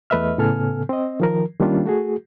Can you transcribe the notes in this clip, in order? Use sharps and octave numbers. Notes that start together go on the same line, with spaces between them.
E2 A3 B4 D#5 E5 F6
A2 C#3 B3 A4 G#5 F6
C4 D#5
D#3 F3 A#4
D#3 G3 A#3 C#4 D4 F4
A3 F#4 G#4